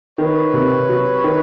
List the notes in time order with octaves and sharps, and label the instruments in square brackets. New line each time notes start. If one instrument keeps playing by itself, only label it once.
[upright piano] D#3 [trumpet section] B4 C#5
[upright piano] C3
F#3
D#3